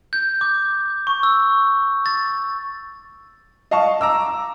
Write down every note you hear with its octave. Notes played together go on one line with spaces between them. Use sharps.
G6
D6
C#6
E6
A6
D#5 F5 A5 C#6
A#5 D6 E6